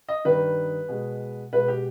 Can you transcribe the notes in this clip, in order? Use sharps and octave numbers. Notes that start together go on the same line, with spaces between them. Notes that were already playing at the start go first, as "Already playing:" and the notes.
D#5
G2 D#3 G3 B4
B2 G#3
B2 G#3 B4
G4